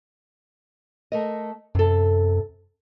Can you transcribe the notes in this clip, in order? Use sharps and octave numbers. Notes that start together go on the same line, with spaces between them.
A3 A#4 D#5
F#2 C3 A4